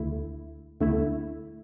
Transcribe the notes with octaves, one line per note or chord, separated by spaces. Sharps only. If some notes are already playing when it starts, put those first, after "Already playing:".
Already playing: D2 D3 A3 E4
D2 D3 A3 E4